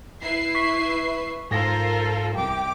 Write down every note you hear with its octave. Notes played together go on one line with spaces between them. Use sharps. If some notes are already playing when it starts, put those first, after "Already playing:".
E4 B4 E5 C7
C#6 B6
G#2 F4 A4 A#4 C5 A#6
C2 G4 D6